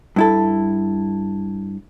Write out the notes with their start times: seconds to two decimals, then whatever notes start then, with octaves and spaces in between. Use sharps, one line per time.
0.16 G2 E4 A4